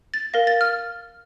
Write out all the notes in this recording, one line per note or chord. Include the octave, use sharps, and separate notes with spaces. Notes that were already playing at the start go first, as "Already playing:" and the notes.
A6
A#4 F5 A#6
A6
F6